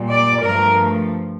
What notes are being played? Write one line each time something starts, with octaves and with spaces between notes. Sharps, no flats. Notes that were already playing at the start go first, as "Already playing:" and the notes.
Already playing: A#2 G3
D5
G2 F3 A3 A#4